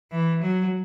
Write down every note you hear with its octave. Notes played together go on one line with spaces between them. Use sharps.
E3
F#3